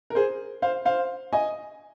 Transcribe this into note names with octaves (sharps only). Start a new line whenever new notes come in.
A#4
G#4 C5
C5 F5
C5 F5
D#5 G#5